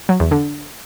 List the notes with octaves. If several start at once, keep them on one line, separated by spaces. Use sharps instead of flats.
F#3
E2
D3